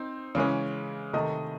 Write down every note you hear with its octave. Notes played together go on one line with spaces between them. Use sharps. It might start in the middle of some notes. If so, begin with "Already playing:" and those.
Already playing: C4 D#4
C#3 E3 G#3 C#4
C3 D#3 A3 D#5